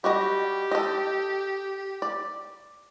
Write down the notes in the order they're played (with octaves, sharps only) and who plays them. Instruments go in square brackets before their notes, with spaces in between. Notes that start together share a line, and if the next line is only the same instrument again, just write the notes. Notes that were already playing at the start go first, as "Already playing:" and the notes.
[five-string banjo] G3 F#4 D#5 [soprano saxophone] G4
[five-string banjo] A4 D#5
D5